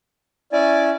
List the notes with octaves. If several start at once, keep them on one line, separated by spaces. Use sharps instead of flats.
C#4 E4 D5 G#5